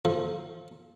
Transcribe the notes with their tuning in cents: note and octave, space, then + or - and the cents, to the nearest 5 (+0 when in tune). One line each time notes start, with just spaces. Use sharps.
F3 +0 A4 -30